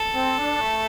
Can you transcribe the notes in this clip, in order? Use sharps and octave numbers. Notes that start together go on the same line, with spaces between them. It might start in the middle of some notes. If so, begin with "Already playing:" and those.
Already playing: A4
C4
D4
A3